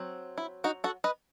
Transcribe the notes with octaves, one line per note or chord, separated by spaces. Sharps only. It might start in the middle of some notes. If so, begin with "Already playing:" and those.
Already playing: F#3 C4
E4
D#4 F#4
F#4 A4
B4 D#5